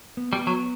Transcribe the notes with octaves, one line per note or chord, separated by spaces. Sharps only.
B3
G3
B3
F#3